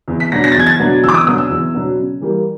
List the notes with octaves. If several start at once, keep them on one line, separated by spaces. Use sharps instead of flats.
E2
B6
B2 F#3 B3 D4 A#6
A#6
A6
E2 G#6
A6
B2 F#3 B3 D4
E2 E6
D6
D#6
B2 F#3 B3 D4 D#6
E6
E2
B2 F#3 B3 D4
C#3
E3 G3 A#3